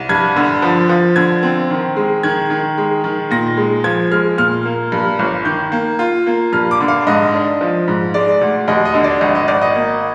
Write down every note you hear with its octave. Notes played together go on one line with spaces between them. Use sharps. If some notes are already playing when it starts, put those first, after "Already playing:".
Already playing: C2
G2 G#6
D3
F3
F3
D3 G#6
C4
D#3
G#3
D#3 G#6
D#3
G#3
D#3
A#2 A#6
G#3
F3 G#6
G#3 F6
A#2 F6
A#3
G2
G1
D#3 G6
A#3
F4
A#3
G2 F6
D6
D3
F5
G#2 D#5
D4
F3
G#2
G#3 D5
D2
D#2 D#5
D#5
D3
D5
G#1 D#5
D#5
G#1 D5
D#5
A#3